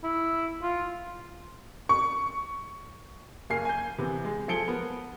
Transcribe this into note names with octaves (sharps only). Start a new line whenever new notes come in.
E4
F4
C#6
F#1 A#3 A#4 G#5 C7
G#5 G6
C3 E3 B3
G#3
F3 G#4 A4 C#7 D7 G7
B3 A#4